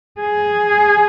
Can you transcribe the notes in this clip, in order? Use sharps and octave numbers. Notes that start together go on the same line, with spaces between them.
G#4